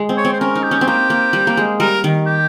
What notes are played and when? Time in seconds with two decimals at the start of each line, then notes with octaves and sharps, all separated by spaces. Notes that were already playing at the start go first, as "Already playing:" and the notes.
Already playing: G#3
0.09 C4
0.17 C#5
0.25 C4
0.33 C5
0.40 C#4 A#4
0.55 D#4
0.64 G4
0.71 C#4
0.81 C4
0.87 A#3 G4
1.10 A#3
1.33 G3
1.47 A#3
1.57 G#3
1.80 G3 A#4
2.04 D#3
2.27 G4